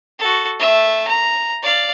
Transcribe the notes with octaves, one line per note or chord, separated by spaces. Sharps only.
F#4 A4
A3 E5
A#5
D5 F5